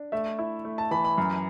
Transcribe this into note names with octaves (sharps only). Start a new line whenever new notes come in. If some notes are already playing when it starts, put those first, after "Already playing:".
Already playing: D4
A3 E5
E4
A3
A5
E3 B5
B5
F#2